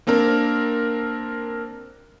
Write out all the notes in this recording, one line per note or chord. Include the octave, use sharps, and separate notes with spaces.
A#3 C4 D4 A#4